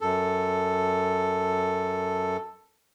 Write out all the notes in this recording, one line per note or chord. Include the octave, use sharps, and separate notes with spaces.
F#2 A4